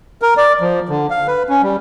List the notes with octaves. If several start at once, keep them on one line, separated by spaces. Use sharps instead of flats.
A#4
D5
F3
D3
F5
B4
C#4
G3